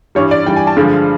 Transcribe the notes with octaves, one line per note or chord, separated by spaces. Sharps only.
G2 E3 G3 C#5
D5
G2 E3 G3 G5
G#5
A5
G2 D3 F3 G#3